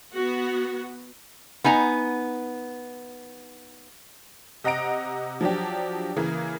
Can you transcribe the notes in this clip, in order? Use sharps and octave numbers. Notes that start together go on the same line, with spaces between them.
B3 F#4
B3 D#4 G#5 A#5
C3 D#5 F#5 A#5 A#6 D7
F3 F#3 D4 G4
C#3 E3 A#3 G#4 A#4